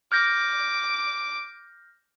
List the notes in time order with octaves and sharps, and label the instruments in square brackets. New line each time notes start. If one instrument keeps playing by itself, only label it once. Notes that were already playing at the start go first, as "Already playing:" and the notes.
[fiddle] D6 [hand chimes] F6 G6 A#6